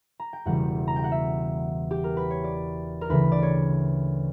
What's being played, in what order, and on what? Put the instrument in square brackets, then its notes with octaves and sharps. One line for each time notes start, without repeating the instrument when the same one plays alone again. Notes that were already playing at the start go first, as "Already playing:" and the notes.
[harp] A#5
G5
E1 E2 C#3 E3 G3 F#5
A#5
G5
F#5
E5
G4
A#4
B4
C#5
D5
A#4
D2 C#3 E3 B4
D5
C#5